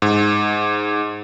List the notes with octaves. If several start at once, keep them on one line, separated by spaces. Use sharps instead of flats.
G#2